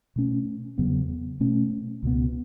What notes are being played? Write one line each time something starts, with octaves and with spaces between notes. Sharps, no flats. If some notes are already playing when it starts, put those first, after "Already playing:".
B2 A3 C#4
E2 C#3 F#3 B3
B2 A3 C#4
C#2 B2 B3